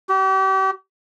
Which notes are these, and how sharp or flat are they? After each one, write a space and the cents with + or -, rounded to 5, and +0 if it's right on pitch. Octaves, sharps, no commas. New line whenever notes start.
G4 -40